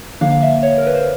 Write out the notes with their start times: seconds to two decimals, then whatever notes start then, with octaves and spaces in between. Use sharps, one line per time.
0.21 D3 F3 A#3 D4 F5
0.32 F5
0.43 E5
0.63 C#5
0.78 A#4
0.87 B4
0.95 C5